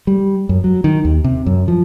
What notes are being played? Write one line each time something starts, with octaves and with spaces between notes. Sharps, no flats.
G3
F#2
F#3
D#3
D#2
C3
F#2
F3